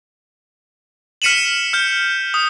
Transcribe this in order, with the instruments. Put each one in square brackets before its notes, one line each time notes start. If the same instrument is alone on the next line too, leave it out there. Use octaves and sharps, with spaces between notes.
[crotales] F6 B6 C#7 D#7 E7 F#7
F6 G6
D#6